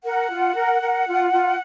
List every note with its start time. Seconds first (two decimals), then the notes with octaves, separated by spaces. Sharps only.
0.04 A#4 F#5
0.31 F4
0.55 A#4
0.81 A#4
1.07 F4
1.32 F4